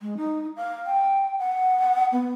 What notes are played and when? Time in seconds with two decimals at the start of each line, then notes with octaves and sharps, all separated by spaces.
0.01 G#3
0.17 D#4
0.56 F5
0.86 G5
1.39 F#5
2.12 B3